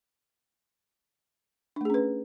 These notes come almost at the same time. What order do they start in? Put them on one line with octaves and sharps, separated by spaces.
D4 A3 G#4 C#4 B4